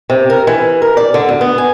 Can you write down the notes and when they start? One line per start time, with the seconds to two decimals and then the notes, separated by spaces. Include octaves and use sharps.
0.10 C3
0.30 A#4
0.47 E3
0.82 A#4
0.97 D5
1.14 D3
1.29 D2
1.41 B3
1.58 G#5